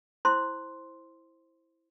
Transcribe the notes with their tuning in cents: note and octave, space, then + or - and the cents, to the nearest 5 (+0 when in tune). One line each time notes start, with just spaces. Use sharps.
E4 +0 C5 +5 C6 +0